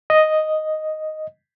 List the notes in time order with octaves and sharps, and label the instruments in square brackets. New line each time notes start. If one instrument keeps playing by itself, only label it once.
[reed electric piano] D#5